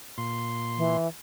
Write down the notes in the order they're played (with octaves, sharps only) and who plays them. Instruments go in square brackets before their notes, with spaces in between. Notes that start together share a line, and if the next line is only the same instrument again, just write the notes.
[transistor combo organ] A#2 C6
[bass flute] E3